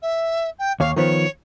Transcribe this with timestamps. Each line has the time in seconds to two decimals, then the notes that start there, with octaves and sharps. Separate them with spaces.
0.02 E5
0.59 G5
0.80 D#2 C#5 F5
0.96 D#3 F3 B3 C#5